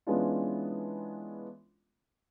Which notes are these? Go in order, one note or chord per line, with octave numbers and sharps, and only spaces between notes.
E3 G#3 B3 C#4 D4 F4